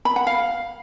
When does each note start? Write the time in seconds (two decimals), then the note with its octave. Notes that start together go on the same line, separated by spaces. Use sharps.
0.05 B5
0.16 F#5
0.27 F5